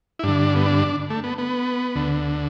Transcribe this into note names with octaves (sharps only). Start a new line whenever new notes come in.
E4
G2 D3 D4
B3
D4
A3
B3
B3
D2 D3